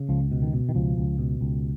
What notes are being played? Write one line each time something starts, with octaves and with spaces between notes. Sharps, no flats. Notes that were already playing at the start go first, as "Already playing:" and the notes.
Already playing: C#3
C#2 F3
B2
D#3
B2
D#3
C#2 F3
C#2
B2
C#2